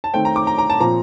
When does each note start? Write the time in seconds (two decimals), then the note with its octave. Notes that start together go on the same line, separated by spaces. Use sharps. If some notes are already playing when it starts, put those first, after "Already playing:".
0.04 A5
0.14 D#3 A3 C4 G5
0.25 A#5
0.36 D6
0.47 A#5
0.58 A#5
0.70 A5
0.80 A#2 F3 C4 A#5